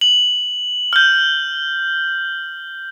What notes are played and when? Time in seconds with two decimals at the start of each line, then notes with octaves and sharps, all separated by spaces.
0.01 F#7
0.93 F6 G6